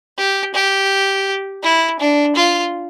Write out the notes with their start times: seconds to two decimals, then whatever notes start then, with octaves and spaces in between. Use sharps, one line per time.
0.17 G4
0.54 G4
1.63 E4
1.99 D4
2.36 F4